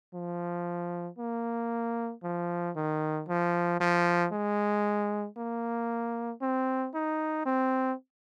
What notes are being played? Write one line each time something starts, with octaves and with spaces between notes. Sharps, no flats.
F3
A#3
F3
D#3
F3
F3
G#3
A#3
C4
D#4
C4